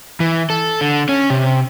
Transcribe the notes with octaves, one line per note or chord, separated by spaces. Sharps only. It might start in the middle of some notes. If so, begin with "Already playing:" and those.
E3
A4
D3
C#4
C3